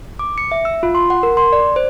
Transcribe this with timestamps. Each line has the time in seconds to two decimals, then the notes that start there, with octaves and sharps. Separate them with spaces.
0.19 D6
0.38 C#7
0.52 E5
0.65 E6
0.83 F4
0.95 C6
1.10 F#5
1.23 A#4
1.37 C6
1.53 D5
1.76 C5